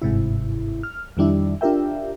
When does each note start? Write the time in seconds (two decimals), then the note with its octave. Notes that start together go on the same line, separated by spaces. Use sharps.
0.02 G1 G#2 C3 E4
0.83 F6
1.17 F2 D#3 G3 D4 E4
1.61 D4 F4 G4 A#4 E5 G5